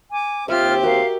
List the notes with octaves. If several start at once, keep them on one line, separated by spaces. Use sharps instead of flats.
G#5 D6
D#2 C4 F4 G4 C5 E5 F6
F#4 A#4 F5